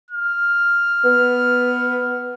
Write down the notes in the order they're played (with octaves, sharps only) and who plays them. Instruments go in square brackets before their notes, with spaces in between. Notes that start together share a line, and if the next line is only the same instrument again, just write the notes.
[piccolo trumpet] F6
[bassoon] B3